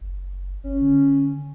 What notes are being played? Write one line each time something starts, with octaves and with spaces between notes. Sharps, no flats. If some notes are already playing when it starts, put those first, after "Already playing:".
F#1
G1 C#4
D3